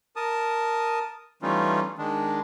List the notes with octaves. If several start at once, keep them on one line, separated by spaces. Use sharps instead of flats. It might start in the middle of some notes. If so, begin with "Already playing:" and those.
A#4 A5 D#6
E3 G3 A3 C#4 D#4 F4
D#3 G#3 D4